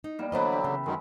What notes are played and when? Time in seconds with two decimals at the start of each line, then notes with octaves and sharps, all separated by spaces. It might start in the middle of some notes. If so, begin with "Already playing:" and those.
0.04 D#4
0.19 G3 A#3 B3
0.32 D3 E3 F#3 D4 B4 C5 D#5
0.52 G4 A4
0.64 C#3
0.86 F#2 D#3 G#3